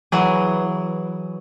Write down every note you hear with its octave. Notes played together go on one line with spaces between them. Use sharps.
E3 F#3 G#4